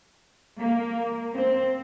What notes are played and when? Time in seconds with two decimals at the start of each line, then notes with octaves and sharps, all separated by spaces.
0.60 A#3
1.34 C4